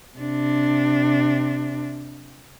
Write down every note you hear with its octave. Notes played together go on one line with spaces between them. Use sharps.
C3 D4